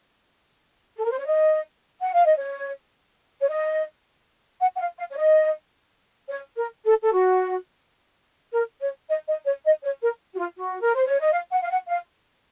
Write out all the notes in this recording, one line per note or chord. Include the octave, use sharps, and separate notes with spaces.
A4
A#4
C5
C#5
D#5
F#5
F5
D#5
C#5
C#5
D#5
F#5
F#5
F5
F5
C#5
D#5
C#5
A#4
A4
A4
F#4
A#4
C#5
D#5
D#5
C#5
D#5
C#5
A#4
F#4
F4
F#4
A#4
C5
C#5
D#5
F5
F#5
F5
F#5
F5